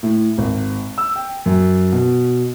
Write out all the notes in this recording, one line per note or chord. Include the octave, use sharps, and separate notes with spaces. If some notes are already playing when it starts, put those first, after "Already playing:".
A2
G#1
E6
G5
F#2
B2